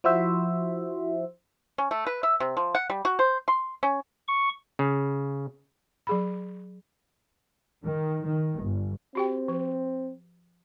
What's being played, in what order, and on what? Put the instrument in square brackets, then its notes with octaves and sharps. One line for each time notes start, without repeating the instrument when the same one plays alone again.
[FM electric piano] F3 E4 F#4 C5 E5
[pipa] C#4
A3
B4
E5
C3
F3
F#5
G3
F#4
C5
C6
C#4
[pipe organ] C#6
[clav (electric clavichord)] C#3
[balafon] F#3 G#4 B5
[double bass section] D#3
D#3
G1
[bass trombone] C4 [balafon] F#4 G4 G5
[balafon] F3